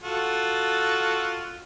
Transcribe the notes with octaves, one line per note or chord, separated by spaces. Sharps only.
F4 F#4 A4